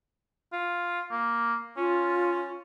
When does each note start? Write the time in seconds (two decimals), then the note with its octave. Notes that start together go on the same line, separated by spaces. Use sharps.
0.53 F4
1.11 A#3
1.77 C#4 F4